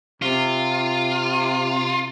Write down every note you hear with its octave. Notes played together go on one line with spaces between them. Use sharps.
C3 F4